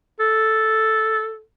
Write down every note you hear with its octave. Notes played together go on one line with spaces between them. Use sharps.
A4